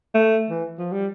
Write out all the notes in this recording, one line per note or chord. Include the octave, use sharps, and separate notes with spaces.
A3
E3
F3
G3